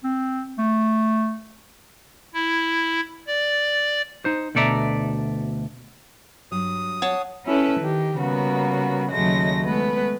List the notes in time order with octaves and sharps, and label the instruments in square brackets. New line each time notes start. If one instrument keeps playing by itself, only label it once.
[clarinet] C4
A3
[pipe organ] E4
D5
[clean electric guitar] D#4 C5
D2 B2 A4 D5 E5 A#5
[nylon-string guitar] G2 F#3 [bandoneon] D#6
[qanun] C#5 A5 [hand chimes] F#5
[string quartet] C#4 E4 A4 B4
D#3 G4
C#3 G3 A#3 B3 F#4
D#2 C#3 F#3 G#3 A3 A#6
G#3 A3 B3 B4